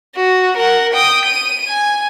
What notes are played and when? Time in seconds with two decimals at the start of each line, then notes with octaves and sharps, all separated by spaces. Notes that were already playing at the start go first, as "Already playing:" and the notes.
0.16 F#4
0.57 A#4 F#5
0.93 G5 D#6
1.26 D#7
1.68 G#5